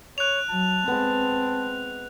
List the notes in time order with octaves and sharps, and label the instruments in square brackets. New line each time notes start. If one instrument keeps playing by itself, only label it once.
[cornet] C#5 [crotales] F#6 F7
[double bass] F#3 [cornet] A5
[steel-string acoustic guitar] G#3 B3 [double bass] C4